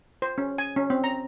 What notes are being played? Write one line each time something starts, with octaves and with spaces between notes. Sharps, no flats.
C5
C#4
G#5
C#4
C4
A#5